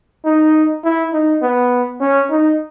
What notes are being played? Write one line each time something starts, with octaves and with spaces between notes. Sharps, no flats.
D#4
E4
D#4
B3
C#4
D#4